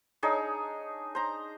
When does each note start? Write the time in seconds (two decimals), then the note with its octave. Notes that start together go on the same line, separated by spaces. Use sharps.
0.23 D4 D#4 G#4 C#5
1.15 C5 A#5